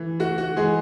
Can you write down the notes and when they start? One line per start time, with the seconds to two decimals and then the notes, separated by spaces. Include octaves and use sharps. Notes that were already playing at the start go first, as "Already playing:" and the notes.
Already playing: E3 A3
0.20 A3 F#4
0.38 F#4
0.56 E3 G#3 G#4